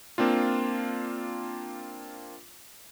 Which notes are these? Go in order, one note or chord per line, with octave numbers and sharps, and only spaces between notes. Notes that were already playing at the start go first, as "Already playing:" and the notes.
A#3 C4 D4 F4